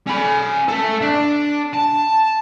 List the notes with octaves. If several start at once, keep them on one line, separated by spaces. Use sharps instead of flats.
C#4 B5
A4 E5
D4
A5